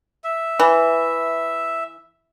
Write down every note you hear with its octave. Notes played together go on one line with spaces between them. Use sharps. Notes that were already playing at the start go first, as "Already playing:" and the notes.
E5
E3